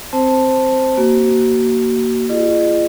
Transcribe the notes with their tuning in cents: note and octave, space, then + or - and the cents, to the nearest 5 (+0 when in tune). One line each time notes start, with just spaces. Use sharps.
C4 +0 C5 +0 A5 +0
A#3 +5 F#4 +30
F4 -35 G#4 +0 D#5 -40